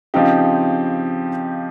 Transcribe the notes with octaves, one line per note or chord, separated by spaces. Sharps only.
C#3 F3 C4 D#4 G4